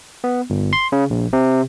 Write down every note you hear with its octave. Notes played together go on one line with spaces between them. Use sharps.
B3
G1
C6
C#3
A#1
C3